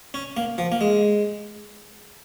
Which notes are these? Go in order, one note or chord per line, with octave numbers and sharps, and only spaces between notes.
C#4
A#3
F3
A#3
G#3